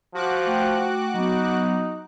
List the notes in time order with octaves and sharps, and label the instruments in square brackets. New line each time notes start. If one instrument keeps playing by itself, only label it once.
[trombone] F3 [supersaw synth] F#4 D6 F#6
[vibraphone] A3 G5
[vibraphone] F#3 B3 [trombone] D#4